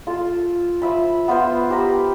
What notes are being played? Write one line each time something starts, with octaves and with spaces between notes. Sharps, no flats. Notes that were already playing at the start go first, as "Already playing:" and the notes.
F4 A4
F3 E5 B5
B3 F4 B4 C5
G4 C5 A#5 B5